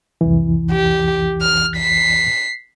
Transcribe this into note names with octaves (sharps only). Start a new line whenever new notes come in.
C2 F2 E3
G4
F6
B6 C7